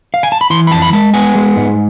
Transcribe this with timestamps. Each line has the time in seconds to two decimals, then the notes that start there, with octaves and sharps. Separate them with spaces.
0.14 F5
0.23 G#5
0.32 A5
0.41 B5
0.50 E3 C6
0.67 B5
0.71 F2 A5
0.82 B5
0.93 G#3 A5
1.14 B3 G#5
1.35 G#3
1.56 G#2